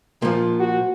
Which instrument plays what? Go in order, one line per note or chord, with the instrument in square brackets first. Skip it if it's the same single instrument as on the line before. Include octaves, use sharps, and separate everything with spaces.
[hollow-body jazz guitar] A#2 F3
[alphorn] F#4